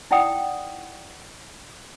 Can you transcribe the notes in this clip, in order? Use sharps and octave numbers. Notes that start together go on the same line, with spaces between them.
D#4 E4 D5 F#5 G5 D#6